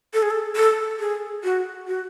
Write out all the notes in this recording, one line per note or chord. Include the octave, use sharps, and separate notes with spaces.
A4
G#4
A4
A4
G#4
F#4
F#4